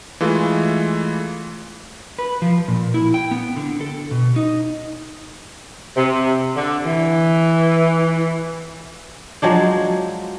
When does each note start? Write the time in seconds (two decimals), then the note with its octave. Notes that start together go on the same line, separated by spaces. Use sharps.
0.21 E3 G#3 A3 F4
2.19 B4
2.42 F3
2.68 A#2
2.94 E4
3.14 G5
3.31 B3
3.57 D3
3.81 A4
4.11 B2
4.36 D#4
5.97 C3
6.56 D3
6.86 E3
9.42 F3 F#3 G#3 D4